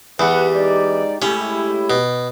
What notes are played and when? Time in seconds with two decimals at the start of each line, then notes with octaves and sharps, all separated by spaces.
0.19 E2 G3 B4 F#5
0.56 G#3 D#4 D5
1.22 A2 G#3 A3 C#4 E4 G4
1.90 B2